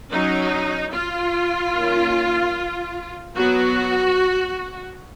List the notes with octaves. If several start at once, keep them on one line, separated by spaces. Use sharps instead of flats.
F#3 C#4 D#4
F4
D#3 A#3 C#4
F#3 B3 F#4